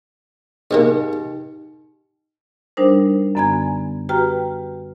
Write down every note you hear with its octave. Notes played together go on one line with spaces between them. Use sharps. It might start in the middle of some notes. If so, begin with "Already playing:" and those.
G#2 G#3 A#3 D#4 G4
G3 D4 D#4 A#4 C5
F#2 D3 B3 G#5 A#5 G#6
F#4 G4 B4 G5 A#5 F6